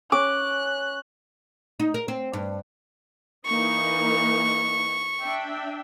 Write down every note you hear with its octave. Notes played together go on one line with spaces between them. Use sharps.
C#4 D6 F#6
D#4
A#4
C4
G2
E3 A#3 D#4 C#6
D4 E5 G5